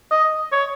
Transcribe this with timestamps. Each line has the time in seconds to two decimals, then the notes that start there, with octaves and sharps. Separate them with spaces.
0.11 D#5
0.52 C#5